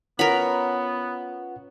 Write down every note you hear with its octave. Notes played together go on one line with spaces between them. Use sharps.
B3 C#4 F4 A#4 B4 F#5 B5